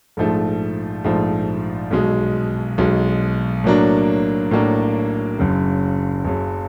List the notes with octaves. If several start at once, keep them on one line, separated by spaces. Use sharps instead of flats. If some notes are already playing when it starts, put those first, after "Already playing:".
A#1 G#2 F3 A3
A#1 G#2 F3 A3
B1 B2 G#3
B1 B2 G#3
A2 F#3 A#3 D4
A2 F#3 A#3 D4
F#1 F#2 C#3
F#1 F#2 C#3